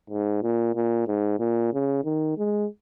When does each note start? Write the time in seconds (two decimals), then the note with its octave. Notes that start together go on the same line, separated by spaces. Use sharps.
0.10 G#2
0.43 A#2
0.75 A#2
1.07 G#2
1.40 A#2
1.73 C#3
2.05 D#3
2.38 G#3